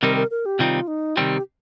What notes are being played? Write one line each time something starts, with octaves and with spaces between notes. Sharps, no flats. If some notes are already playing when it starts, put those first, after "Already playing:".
C3 D#3 G3 C4 D#4 A#4
A#4
A#4
G4
C3 D#3 G3 C4 D#4 F4
D#4
C3 D#3 G3 C4 D#4 G4